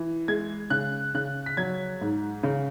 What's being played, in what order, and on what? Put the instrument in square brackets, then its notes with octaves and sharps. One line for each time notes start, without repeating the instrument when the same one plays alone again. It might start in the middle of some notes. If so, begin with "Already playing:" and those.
Already playing: [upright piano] E3
G#3 G#6
C#3 F#6
C#3 F#6
B6
F#3 G#6
G#2
C#3